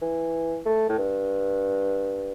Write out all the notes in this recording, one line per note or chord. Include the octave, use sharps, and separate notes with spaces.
E3
A3
A2
G2